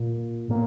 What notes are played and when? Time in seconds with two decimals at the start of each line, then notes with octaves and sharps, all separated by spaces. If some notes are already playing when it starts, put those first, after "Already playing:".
Already playing: A#2
0.49 A2 A#3